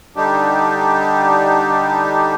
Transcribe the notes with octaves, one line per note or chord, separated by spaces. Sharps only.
D3 G3 D4 D#4 G4